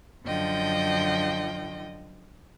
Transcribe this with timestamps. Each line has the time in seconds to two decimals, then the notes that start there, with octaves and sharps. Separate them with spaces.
0.24 F#2 D3 F3 D#5 G5